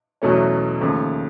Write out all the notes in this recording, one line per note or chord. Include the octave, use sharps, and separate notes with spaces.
E2 B2 F#3 A3 C#4
D#2 C#3 F3 A3